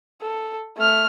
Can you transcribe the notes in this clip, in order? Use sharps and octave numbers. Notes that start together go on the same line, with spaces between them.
A4
A3 F6